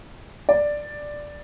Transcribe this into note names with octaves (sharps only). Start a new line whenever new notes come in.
D5